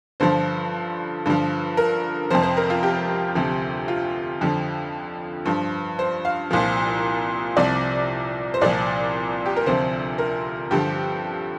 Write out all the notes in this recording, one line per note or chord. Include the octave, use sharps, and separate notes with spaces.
G2 D3 F3 C5
G2 D3 F3
A#4
F2 C3 F3 C5
C5
A#4
F4
G4
D2 C3 F3
F4
F2 D3 F3
G2 F3
C5
F5
C2 A#2 F3
C2 C3 F3 D5
C5
C2 A#2 F3 D5
G4
A#4
D2 C3 F3 C5
A#4
G2 D3 F3 G4